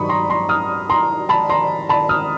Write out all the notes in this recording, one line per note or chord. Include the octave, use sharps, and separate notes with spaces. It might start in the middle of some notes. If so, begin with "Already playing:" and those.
Already playing: G2 D#3 F#3 B5 C#6 D#6
A#5 C6
A#5 C6
D#6 F6
A#5 C6
A5 B5
A#5 C6
A5 B5
D#6 F6